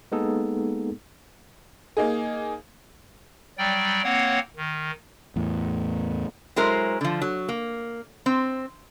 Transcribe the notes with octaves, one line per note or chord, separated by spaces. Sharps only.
G#3 A#3 B3 D#4 G#4 A4
A#3 D#4 G#4
F#3 G3 D5 G5
A#3 C4 C#5 F#5
D#3
E2 A2
F#3 G#3 E4 A#4 C5
D3 F3
F#3
A#3
C4